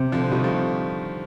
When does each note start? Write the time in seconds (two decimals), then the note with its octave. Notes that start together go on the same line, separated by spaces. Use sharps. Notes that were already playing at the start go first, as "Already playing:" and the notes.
Already playing: C3
0.12 D3 F3
0.31 C3 D#3 G3
0.44 F3 A3